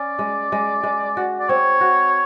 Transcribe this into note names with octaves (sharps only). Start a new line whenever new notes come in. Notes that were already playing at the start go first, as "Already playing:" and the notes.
Already playing: C#4 D5
G#3
G#3
G#3
F#4
D5
C4 C#5
F#4